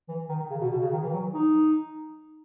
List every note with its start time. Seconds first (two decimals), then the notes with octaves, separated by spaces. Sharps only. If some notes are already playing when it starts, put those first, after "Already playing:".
0.08 E3
0.29 D#3
0.40 D#3
0.50 C#3
0.61 B2
0.71 B2
0.82 C#3
0.93 D#3
1.03 E3
1.13 F#3
1.34 D#4